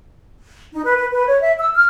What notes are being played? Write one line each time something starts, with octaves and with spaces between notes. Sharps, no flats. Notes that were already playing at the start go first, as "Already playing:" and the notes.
D#4
B4
B4
B4
C#5
E5
E6
F6